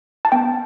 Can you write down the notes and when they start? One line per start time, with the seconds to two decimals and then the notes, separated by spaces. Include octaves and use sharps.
0.25 A5
0.32 B3 G5